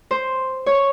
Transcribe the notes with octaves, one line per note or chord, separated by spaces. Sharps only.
C5
C#5